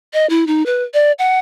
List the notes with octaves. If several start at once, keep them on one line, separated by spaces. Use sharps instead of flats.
D#5
E4
D#4
B4
D5
F#5